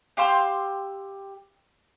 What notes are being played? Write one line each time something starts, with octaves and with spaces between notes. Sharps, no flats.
G4 F5 C6 E6